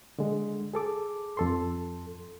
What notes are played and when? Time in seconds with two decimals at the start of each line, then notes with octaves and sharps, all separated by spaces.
0.19 D3 G#3
0.74 G#4 A4 D6
1.37 F2 A4 C6